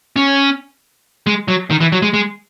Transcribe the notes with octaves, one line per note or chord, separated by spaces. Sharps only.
C#4
G#3
F#3
D#3
E3
F#3
G#3
G#3